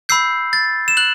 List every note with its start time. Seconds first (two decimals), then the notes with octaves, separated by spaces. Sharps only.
0.09 B5 E6 G6 C7
0.53 A6
0.88 E7
0.97 F#6 F#7